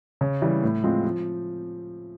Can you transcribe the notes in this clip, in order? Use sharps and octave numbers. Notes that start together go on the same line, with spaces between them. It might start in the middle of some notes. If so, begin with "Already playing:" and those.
C#3
E3 G3
A2
F3 G#3 C4 F4
F3